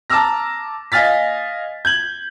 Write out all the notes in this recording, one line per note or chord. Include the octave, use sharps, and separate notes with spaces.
A5 A#5 D6 E6 F6 A#6
D#5 F5 G#5 F6 A6 B6
G6 G#6 F#7